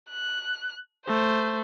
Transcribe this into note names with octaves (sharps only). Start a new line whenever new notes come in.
F#6
A3 C5